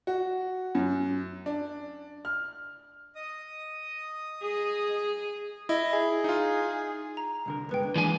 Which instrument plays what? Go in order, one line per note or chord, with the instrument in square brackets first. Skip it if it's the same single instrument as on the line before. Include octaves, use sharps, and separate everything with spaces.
[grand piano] F#4
F#2
D4
F6
[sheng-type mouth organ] D#5 D#6
[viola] G#4
[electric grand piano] E4 [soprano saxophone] D#5
[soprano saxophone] G#4
[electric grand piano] D#4 F4
[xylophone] A#5
[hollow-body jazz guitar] C2 D3 A#4
[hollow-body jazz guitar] G2 G#3 B3 [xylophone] B4 G5
[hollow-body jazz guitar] D3
[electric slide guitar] E3 G#3 G#5 [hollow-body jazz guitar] A#3 D4